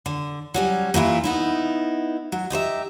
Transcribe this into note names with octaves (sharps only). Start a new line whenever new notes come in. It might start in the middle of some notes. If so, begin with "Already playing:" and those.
D3
F#3 G3 C#4
A#2 E3 E4 F4
B3 D#4 E4
F#3
D#4 G4 C5 E5